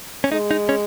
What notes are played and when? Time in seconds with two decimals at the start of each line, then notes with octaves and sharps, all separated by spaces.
0.24 C#4
0.32 G#3 D#4
0.51 D#4
0.69 C#4